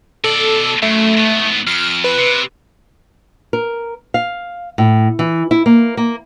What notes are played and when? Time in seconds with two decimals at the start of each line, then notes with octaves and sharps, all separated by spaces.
0.24 B2 A4 D5
0.82 F#2 A3
1.17 G#2 B3
1.67 F2 F6
2.04 B4
2.18 C3
3.53 A#4
4.14 F5
4.78 A2
5.19 E3
5.51 E4
5.66 A#3
5.97 A#3